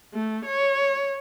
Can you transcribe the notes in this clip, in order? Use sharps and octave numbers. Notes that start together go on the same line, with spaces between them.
A3
C#5